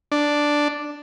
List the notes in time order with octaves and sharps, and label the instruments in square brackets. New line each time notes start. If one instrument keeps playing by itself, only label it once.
[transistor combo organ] D4